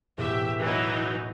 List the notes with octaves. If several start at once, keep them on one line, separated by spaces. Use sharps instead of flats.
E1 A2 B3 G4 E5
E3 F#3 D#4